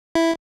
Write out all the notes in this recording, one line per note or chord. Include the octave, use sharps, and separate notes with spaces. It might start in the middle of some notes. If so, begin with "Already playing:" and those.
E4